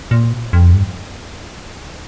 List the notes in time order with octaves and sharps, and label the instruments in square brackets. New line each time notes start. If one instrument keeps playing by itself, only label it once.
[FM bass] A#2
F2
G2